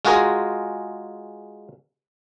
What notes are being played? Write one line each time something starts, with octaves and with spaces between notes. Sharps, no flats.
G#3 F4 F#4 G#4 A#4